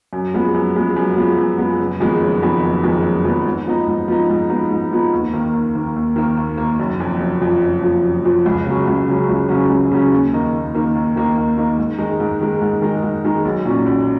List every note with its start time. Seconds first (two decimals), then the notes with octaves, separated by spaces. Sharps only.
0.13 F#2
0.34 F3 G#3 B3
0.54 F#2
0.76 F3 G#3 B3
0.96 F#2
1.17 F3 G#3 B3
1.37 F#2
1.58 F3 G#3 B3
1.79 F#1
2.00 F2 D#3 G#3 B3
2.21 F#1
2.42 F2 D#3 G#3 B3
2.63 F#1
2.83 F2 D#3 G#3 B3
3.05 F#1
3.25 F2 D#3 G#3 B3
3.45 G#2
3.67 F3 B3 D#4
3.87 G#2
4.08 F3 B3 D#4
4.29 G#2
4.50 F3 B3 D#4
4.71 G#2
4.92 F3 B3 D#4
5.13 D#2
5.33 D#3 A#3
5.53 D#2
5.75 D#3 A#3
5.96 D#2
6.16 D#3 A#3
6.37 D#2
6.58 D#3 A#3
6.79 F#1
7.00 F2 F3
7.20 F#1
7.42 F2 F3
7.63 F#1
7.83 F2 F3
8.04 F#1
8.24 F2 F3
8.46 C#2
8.67 C#3 F#3 C#4
8.87 C#2
9.08 C#3 F#3 C#4
9.29 C#2
9.49 C#3 F#3 C#4
9.70 C#2
9.91 C#3 F#3 C#4
10.12 D#2
10.33 D#3 A#3 D#4
10.53 D#2
10.74 D#3 A#3 D#4
10.95 D#2
11.16 D#3 A#3 D#4
11.36 D#2
11.57 D#3 A#3 D#4
11.78 G#2
11.99 D#3 G#3 D#4
12.20 G#2
12.40 D#3 G#3 D#4
12.61 G#2
12.82 D#3 G#3 D#4
13.03 G#2
13.24 D#3 G#3 D#4
13.45 B1
13.65 A#2 F#3 C#4
13.86 B1